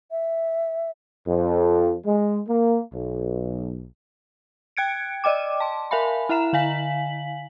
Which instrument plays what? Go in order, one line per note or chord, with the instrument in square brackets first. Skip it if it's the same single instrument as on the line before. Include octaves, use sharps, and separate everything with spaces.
[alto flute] E5
[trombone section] F2
G#3
A#3
B1
[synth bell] G5 F#6 G#6 C#7 D7
D5 D#5 G5 D6
A5 C6
A#4 E5 F5 G#5 B5
E4 E5 A#5 E7
D3 F5 G#5 B6 F#7